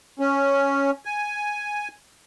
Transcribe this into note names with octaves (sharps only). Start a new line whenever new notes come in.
C#4
G#5